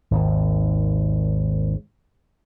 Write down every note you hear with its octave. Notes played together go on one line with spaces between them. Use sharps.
G#1 D#2